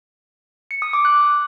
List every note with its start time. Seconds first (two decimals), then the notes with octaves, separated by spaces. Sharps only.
0.71 C#7
0.82 D#6
0.93 D6
1.05 F#6